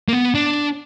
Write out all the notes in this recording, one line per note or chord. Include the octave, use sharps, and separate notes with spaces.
A#3
B3
D4